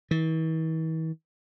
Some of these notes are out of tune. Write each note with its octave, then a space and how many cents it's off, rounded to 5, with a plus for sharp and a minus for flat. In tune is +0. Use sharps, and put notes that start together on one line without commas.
E3 -45